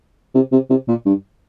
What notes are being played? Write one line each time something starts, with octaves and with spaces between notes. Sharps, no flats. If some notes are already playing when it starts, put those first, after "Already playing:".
C3
C3
C3
A#2
G2